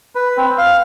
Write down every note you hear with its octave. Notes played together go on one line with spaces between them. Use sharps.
B4
C4
F5